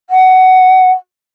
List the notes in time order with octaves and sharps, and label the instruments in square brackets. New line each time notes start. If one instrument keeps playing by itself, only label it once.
[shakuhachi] F#5